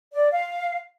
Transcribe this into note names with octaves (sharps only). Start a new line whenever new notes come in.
D5
F5